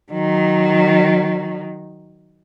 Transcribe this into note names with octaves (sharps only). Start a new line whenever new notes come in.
D#3 F#3